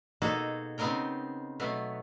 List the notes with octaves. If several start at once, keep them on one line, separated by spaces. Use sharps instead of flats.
B2 A#3 D#4 F#4 G#4 A4
C#3 B3 C4 D#4 A#4 G5
B2 F#3 A3 B3